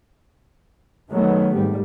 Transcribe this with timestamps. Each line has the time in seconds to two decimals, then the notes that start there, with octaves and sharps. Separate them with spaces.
1.11 D#3 F#3 A3 B3
1.54 G#1 G3